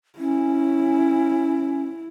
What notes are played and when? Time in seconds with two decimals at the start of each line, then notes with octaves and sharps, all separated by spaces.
0.18 C#4 E4